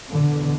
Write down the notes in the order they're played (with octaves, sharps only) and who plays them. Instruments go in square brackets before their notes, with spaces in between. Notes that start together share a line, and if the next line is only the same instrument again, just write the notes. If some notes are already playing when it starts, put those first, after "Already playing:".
[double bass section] E2 B2 D3